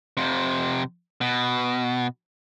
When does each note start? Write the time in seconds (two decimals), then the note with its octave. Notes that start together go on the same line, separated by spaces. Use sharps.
0.17 F2 C3
1.21 B2